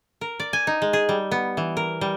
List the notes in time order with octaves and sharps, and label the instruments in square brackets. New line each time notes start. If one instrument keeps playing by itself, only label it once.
[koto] A#4
D5
G#5
D#4
G#3
G#4
G3
B3
E3
A#4
G3